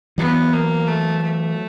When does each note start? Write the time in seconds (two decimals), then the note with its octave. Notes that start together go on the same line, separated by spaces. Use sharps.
0.18 E3 F#3 B3
0.53 A#3
0.87 A3
1.22 A3